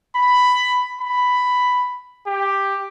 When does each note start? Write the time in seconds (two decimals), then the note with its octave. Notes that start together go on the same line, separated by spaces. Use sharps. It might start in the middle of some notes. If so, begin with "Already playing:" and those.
0.15 B5
1.00 B5
2.26 G4